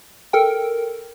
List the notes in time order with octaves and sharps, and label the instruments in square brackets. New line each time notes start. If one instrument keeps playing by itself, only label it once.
[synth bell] A4 A#4 G5